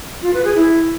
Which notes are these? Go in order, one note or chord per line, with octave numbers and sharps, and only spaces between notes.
F4
B4
G#4
E4